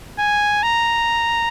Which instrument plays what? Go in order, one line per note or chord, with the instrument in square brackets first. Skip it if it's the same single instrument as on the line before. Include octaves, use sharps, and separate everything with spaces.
[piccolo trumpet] G#5
A#5